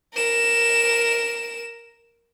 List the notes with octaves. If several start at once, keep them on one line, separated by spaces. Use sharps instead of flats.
A#4 E7